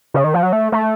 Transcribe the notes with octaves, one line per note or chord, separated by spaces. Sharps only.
C#3
D#3
F3
F#3
A3
A3